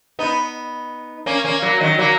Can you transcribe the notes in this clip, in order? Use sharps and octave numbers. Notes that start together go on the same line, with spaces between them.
B3 D#4
A#3 C#4
A#3 C#4
F#3 A#3
D#3 F#3
F#3 A#3